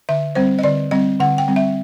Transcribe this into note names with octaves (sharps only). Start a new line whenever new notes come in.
D3 E5
G3 C4 C5
D#5
D3 D5
G3 C4 D#5
D3 F#5
G5
G3 C4
E5